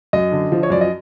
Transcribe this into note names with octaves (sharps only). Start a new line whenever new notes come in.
F#2 D#5
D3
F3
C#5
F#2 D5
D#5